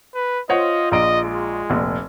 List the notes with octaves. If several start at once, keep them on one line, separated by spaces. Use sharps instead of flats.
B4
F4 C5 C#5 D#5 F#5
A#1 D#5 A#5 D7
G#3
F1 A#1